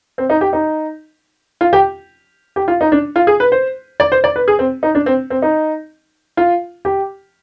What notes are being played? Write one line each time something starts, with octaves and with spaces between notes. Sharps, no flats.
C4
D#4
G4
D#4
F4
G4
G4
F4
D#4
D4
F4
G#4
B4
C5
D5
C5
D5
B4
G#4
C4
D#4
D4
C4
C4
D#4
F4
G4